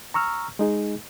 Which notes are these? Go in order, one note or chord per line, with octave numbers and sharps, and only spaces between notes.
A#5 C#6 E6 F6
G#3 D#4 G#4